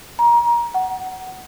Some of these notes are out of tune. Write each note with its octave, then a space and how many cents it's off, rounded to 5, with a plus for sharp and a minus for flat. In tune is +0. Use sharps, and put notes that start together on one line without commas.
A#5 +25
F#5 +15